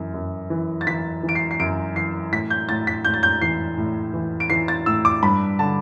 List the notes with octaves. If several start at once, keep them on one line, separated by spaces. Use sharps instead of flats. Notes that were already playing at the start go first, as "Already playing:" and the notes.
Already playing: F#2 E3
F#2
E3
A6
E3 B6
E3
D7
C7
C7
F#2 D7
E3 C7
A2 B6
G6
A2 A6
B6
A2 G6
A6
G6
E3 C7
A2
E3
D7
E3 C7
A6
A2 E6
D6
G2 B5
D3 A5